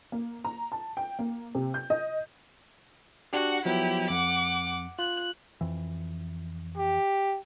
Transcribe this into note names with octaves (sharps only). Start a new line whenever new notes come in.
A#3
A#5
A5
G5
A#3
C3
G6
D#5
D4 F#4 G4 F#5
F3 F#3 B3 E4 G4
F2 F#5 D6
F4 F#6
F2 E3
G4